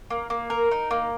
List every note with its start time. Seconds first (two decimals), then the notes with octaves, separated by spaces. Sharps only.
0.10 A#3
0.30 A#3
0.50 A#4
0.71 D#4
0.91 A#3